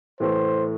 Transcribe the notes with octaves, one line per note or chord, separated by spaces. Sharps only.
A2 E3 A3 C5